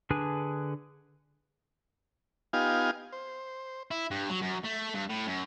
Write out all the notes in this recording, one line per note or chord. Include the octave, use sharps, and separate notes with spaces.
D3 D4 G#4 B4 G#5
B3 D#4 F4 G4 F5 G#5
C5
E4
G2
F#3
F#2
A3
G2
A2
F#2